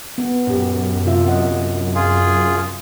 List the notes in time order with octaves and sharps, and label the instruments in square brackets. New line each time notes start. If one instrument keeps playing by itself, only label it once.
[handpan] B3
[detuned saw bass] F#2 [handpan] A#2 G4
[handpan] C3 F4 E5
D#5 F#5
[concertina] F4 G#4